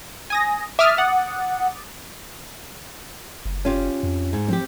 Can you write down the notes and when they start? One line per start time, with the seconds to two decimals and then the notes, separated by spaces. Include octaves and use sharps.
0.30 G#5 D#6 A#6
0.79 E5 D6 D#6 F6 A6
0.98 F#5
3.45 F#1
3.65 C#4 F4 G4
4.03 F2
4.33 G#2
4.49 F3 C4 G4